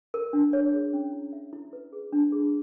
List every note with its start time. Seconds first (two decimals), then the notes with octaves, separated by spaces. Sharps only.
0.14 A#4
0.33 D4
0.53 C#5
0.73 G#4
0.93 C#4
1.13 E4
1.33 E5
1.53 E4
1.73 B4
1.93 G#4
2.13 D4
2.32 G#4